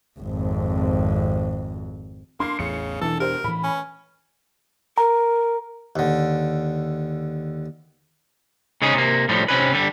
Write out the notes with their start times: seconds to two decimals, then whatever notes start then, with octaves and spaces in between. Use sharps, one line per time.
0.19 G#1 F2
2.40 A#3 D4 C6 C7
2.59 A1 E2 A2 C#3 C#7
3.01 E1 B2 E3 D4 A4
3.20 G4 A#4 C5
3.44 A2 E3 B5
3.64 C#4
4.98 A#4 A#5
5.96 D#2 D3
8.82 C#3 G#3 C#4 D#4 G#4
8.94 C3 A#3
9.29 A2 F3 G3
9.48 C3 C4 C#4 B4
9.73 D3 G3